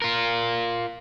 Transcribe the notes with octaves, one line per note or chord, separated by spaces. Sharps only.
F4 A#4